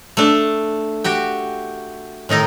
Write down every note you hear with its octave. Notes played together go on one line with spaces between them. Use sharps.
A3 D4
F#4 G4 G5
A2 D#3 D#4 A#4